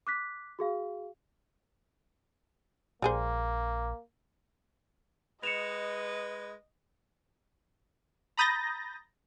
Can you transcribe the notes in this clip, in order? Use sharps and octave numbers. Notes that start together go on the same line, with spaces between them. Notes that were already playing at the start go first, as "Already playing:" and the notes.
D6 F#6 B6
F#4 G#4 F5
A#1 G3 A#3 G#4 C5
G#3 B4 D#5 C#7 E7 F7
A#5 B5 D#6 G6 A6 A#6